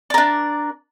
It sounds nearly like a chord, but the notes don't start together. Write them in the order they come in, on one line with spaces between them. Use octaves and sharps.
D5 A#4 D4